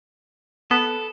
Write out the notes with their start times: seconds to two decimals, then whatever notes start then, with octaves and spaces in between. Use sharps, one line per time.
0.71 B3 A4